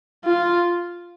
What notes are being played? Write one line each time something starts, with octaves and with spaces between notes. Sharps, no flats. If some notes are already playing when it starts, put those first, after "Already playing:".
F4